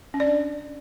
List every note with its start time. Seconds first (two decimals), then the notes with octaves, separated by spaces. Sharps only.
0.14 C#4
0.20 D5
0.26 D4